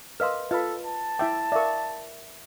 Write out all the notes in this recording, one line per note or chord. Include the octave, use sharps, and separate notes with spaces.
A#4 B4 D#5 F5 C6 E6
F4 A4 B4 D#5 B5
A5
E4 E5 G5 D6
A#4 D5 E5 F5 C#6